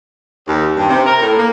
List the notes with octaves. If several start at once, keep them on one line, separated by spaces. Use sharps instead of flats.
D#2
G2
C3
A#4
A2
A#3